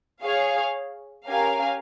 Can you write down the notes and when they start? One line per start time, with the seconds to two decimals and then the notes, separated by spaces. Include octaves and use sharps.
0.22 G#4 C#5 F5
1.27 C#4 G4 A#4 F5 G#5